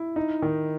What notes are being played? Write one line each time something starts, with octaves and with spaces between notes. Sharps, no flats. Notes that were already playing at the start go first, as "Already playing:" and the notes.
Already playing: E4
D#4
D#3